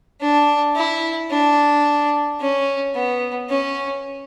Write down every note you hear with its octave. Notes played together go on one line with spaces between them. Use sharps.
D4
E4
D4
C#4
B3
C#4